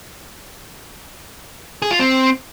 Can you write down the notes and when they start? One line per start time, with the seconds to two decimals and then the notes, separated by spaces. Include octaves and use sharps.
1.82 G#4
1.91 F4
1.99 C4